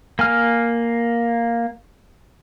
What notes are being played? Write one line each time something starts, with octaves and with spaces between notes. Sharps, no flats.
A#3 G#5 F6